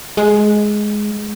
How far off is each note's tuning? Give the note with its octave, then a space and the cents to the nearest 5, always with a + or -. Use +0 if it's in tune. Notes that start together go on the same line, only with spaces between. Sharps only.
G#3 +10